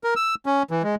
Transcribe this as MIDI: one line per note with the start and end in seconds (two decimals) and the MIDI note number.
0.04 0.14 70
0.16 0.35 88
0.46 0.63 61
0.71 0.83 52
0.83 0.95 56